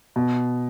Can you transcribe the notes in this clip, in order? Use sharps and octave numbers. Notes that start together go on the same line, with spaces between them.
B2